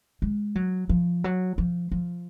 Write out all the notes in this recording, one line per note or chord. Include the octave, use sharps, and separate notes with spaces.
G#3
F#3
F3
F#3
F3
F3